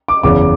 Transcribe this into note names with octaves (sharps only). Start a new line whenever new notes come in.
D6
F#1 E2 C#3 D6